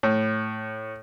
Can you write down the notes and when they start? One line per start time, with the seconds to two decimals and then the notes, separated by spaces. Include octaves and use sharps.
0.03 A2